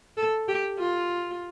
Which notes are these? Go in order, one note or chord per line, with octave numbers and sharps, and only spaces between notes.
A4
G4
F4